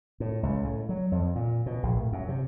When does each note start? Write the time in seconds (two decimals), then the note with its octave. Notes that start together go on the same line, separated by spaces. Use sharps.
0.20 A2
0.43 C#2
0.65 A2
0.89 F#3
1.12 F2
1.35 A#2
1.66 B2
1.83 A#1
1.97 A2
2.13 F#2
2.28 C3